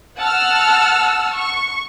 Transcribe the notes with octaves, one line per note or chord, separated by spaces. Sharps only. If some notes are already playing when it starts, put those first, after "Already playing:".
F#5 A5 E6 F6
C#6